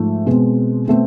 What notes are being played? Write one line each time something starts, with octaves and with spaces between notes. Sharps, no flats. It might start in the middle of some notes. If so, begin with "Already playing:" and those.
Already playing: G#2 F3 A3
B2 G#3 C4
B2 A3 C4